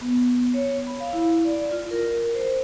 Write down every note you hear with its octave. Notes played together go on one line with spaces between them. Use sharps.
B3
C#5
B5
F5
E4
D5
F4
A#4
C5